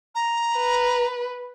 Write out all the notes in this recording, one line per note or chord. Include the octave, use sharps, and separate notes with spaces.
A#5
B4